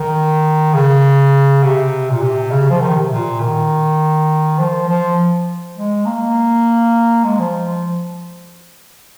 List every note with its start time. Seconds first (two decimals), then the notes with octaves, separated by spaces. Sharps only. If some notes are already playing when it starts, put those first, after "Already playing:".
Already playing: D#3
0.74 C#3
1.63 C3
2.10 A#2
2.22 C3
2.51 C#3
2.70 F3
2.81 D#3
2.96 C3
3.10 A#2
3.40 D#3
4.59 F3
4.88 F3
5.77 G#3
6.06 A#3
7.24 G#3
7.39 F3